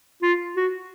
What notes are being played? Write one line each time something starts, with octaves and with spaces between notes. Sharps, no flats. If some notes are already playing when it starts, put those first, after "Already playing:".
F4
F#4